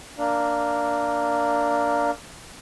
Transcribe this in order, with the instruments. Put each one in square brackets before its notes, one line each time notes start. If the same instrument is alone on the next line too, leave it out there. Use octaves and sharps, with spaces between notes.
[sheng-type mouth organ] A#3 D4